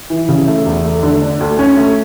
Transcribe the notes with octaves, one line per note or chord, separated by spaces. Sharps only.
E3
C#3
A3
E2
A3
D3
D4
D2
C#4
A3